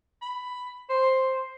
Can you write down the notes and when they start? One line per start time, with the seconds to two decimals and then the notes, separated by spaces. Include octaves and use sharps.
0.22 B5
0.90 C5